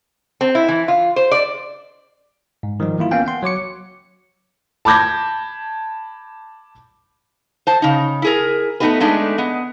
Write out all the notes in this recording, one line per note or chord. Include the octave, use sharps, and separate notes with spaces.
C4
E4
E3
F4
C5
D5
G#2
D#3 F3 G3 D#4
E3 A#3 E4 F4
A#3 B3 C#4 F5 G5 G#5
F#5 C6
F#3 C#5 D6 C#7
A5 B5 D6 G6 G#6 A#6
C5 A5
C#3 D#4
E4 G#4 A#4
A3 B3 C4 D#4 G4 B4
G#3 A3 B3 D4 D#4
B3 D#5